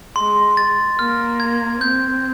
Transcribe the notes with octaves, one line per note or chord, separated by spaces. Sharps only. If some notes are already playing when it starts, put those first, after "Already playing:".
G#3 C6
A6
A#3 F6
G#6
C4 G6